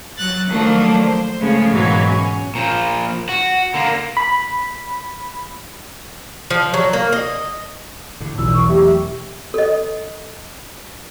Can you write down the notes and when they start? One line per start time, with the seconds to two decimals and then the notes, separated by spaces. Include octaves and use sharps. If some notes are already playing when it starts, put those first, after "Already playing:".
0.17 F#3 F#6 A6
0.47 D#3 F3 F#3 A3 A#3 D4
1.01 C5
1.40 C#3 F3 G#3 A3 B3
1.72 G#2 B2 E3 F#3 A#3
2.07 C#4
2.55 A#2 F3
3.29 F#4
3.74 D3 A#3
4.17 B5
6.50 F3
6.74 F#3
6.93 A#3
7.13 D#5
8.20 A2 D3
8.38 E1 B1 E3 E6
8.54 C#6
8.68 B2 F#3 A3 G4 E5
9.54 A4 D#5